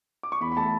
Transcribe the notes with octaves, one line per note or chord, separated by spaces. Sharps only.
D6
C#6
E2 B5
B5
A3 A5